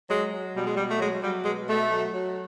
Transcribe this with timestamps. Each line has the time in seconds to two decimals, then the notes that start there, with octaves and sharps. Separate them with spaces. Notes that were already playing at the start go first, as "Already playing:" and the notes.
0.08 F#3 G#3
0.31 F#3
0.54 B2 G3
0.64 G#3
0.74 B2 G3
0.88 A3
0.99 F#3 G#3
1.21 F#3 G3
1.44 B2 G#3
1.68 B2 A3
1.90 F#3
2.13 F#3